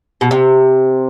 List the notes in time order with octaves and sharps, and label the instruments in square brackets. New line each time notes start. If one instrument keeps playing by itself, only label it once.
[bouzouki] B2
C3